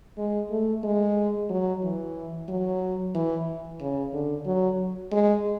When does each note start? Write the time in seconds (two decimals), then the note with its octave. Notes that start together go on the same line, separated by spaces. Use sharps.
0.18 G#3
0.51 A3
0.84 G#3
1.50 F#3
1.83 E3
2.49 F#3
3.15 E3
3.81 C#3
4.13 D3
4.46 F#3
5.12 G#3